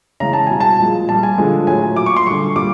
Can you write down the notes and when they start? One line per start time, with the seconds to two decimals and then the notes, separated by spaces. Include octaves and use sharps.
0.20 C#3 E3 G#3 A#5
0.33 A5
0.47 B2 G3 G#5
0.60 A5
0.79 A#2 F3 G#3
1.08 A#2 G3 A5
1.23 G#5
1.38 D3 F3 G#3
1.67 A2 F#3 G#5
1.96 A#2 F#3 D6
2.06 C#6
2.16 C6
2.26 D3 G3 C#6
2.56 A#2 G3 D6